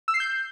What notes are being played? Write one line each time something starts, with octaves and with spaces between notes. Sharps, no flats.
E6
C7
G6